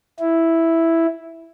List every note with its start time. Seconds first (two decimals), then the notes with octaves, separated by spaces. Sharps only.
0.19 E4